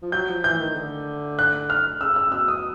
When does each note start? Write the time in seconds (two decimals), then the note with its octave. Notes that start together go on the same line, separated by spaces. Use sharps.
0.02 F3
0.12 F#3 G6
0.29 F3
0.44 E3 G6
0.60 D#3
0.75 D3
1.39 F#6
1.70 F6
2.01 C#3 E6
2.16 E6
2.32 B2 E6
2.48 D#6